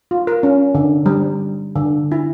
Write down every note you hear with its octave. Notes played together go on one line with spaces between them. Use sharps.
F4
A#4
C#4
D3
G3
D3
E4